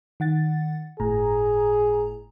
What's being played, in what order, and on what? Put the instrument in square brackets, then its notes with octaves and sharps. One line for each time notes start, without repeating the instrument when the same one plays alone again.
[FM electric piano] D#3 F#5 A6
[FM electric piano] G1 A2 A#5 [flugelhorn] G#4